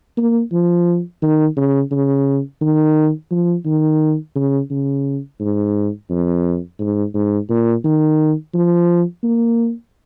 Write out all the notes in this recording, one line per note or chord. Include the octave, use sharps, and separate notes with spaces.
A#3
F3
D#3
C#3
C#3
D#3
F3
D#3
C#3
C#3
G#2
F2
G#2
G#2
A#2
D#3
F3
A#3